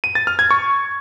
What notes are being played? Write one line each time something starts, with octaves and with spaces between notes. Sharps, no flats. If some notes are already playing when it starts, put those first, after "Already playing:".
D#7
A6
F6
G#6
C#6